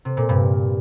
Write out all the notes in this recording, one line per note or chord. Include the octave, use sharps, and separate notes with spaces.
C3
A#2
G2